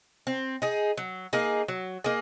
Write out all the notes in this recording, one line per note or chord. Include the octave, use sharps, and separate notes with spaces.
C4
D#4 G#4
F#3
A#3 D#4 G#4
F#3
A#3 D#4 G#4